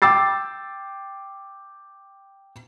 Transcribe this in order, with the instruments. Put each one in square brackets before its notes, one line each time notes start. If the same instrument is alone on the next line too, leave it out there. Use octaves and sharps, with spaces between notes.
[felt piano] G5 D6 E6 A6 C7